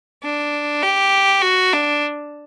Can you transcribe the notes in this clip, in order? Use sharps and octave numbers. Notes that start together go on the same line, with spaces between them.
D4
G4
F#4
D4